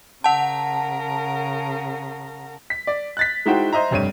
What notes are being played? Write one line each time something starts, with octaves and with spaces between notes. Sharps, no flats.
C#3 A#4 F#5 A5
B6
D5
F#6 A6 B6
G#3 D#4 E4 F#4 C5 G5
C5 D#5 E5 A#5
F1 G2 C#5 D#7